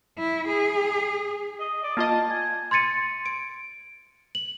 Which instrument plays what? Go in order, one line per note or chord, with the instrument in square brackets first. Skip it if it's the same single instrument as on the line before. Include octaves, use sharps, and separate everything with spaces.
[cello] E4
G#4
[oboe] D#5
D5
[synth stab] A#3 F4 D#5 [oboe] A5
[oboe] G#5
[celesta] C6 G#6 A6 C#7 D#7
D7
F#7